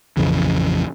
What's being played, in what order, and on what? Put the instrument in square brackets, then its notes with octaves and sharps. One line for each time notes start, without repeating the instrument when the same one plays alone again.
[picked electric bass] A#1 F2 C#3 E3